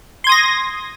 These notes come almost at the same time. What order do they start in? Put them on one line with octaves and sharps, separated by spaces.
C6 G#6 D#6 A#6